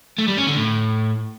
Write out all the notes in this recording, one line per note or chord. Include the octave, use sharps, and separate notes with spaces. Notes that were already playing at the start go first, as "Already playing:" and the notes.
A3
G3
C#4
D3
A2